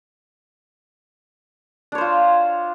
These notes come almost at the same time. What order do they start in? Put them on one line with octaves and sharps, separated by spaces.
D4 C#5 C5 F4